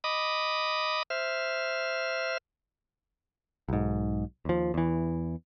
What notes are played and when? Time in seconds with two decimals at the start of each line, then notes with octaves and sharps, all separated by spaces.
0.04 D#5 B5 D6 D#6
1.10 C5 E5 F6
3.69 B1 G#2
4.45 D#2 F3
4.74 E2 E3